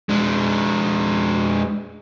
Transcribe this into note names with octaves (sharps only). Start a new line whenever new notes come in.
G#3 D4